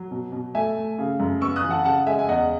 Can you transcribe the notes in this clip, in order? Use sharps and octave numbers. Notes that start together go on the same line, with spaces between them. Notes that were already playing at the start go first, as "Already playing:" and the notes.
Already playing: F#3
B2
B2
A3 E5 G#5
A3
C#3
F#2
B3 C#6 E6
D#6 F#6
E3
F#5 A5
C#3 F#5 A5
G#3 E5 G#5
G#5
E2 D#5 F#5